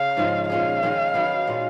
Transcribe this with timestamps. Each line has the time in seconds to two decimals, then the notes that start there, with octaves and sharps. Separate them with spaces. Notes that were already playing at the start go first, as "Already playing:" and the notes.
Already playing: C#3 F5
0.17 G#2 F3 G#3 C#4
0.49 A#2 G#3 C#4 G#4 F5
0.83 D#3 G#3 C#4 G#4
1.14 D#3 F#3 B3
1.47 A#2 G#3 C#4 F4